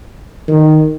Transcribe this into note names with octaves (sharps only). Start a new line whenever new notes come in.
D#3